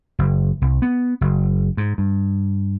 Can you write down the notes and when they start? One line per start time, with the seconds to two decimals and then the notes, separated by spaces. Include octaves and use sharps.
0.19 F#1
0.62 C2
0.82 B3
1.21 F#1
1.77 G#2
1.98 G2